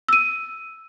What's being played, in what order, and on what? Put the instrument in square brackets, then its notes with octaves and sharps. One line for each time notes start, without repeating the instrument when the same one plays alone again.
[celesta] E6 D#7